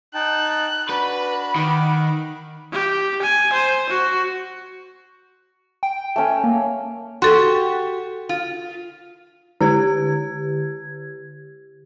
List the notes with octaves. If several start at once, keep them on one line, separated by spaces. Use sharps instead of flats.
D#4 G5 A5 F#6
D4 F#4 B4 B5
D#3 F#5 D6
G4
G#5
C5
F#4
G5
A3 C#4
A#3
F#4 G4 A4 C6
F4
D3 E4 G4 G#6